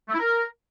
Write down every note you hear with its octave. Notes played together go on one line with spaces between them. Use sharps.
A3
E4
A#4